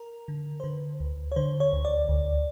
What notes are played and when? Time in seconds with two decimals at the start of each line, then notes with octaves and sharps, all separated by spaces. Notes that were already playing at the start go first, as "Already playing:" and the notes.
Already playing: A#4
0.28 D3
0.60 C5
0.64 D3 B4
1.00 D2
1.32 C#5
1.36 D3 C5
1.60 C#5
1.73 D2
1.85 D5
2.09 D2